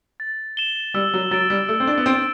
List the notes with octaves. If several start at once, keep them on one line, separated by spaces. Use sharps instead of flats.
A6
E7 G7
G3 E6
F#3
F#3 A6 D7
G3
A3 E6
C4
D4
B3
C4 A6 D7